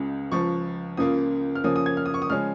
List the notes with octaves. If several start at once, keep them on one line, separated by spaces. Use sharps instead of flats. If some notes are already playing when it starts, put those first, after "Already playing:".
Already playing: C#2 C#3 G#3
C#2 C#3 F3 C#6
C#2 C#3 A#3 F4 D#6
F6
C#3 F3 A#3 C#4 D#6
D#6
G#6
F6
D#6
C#6
D#6
C#3 F3 G#3 C#4 F6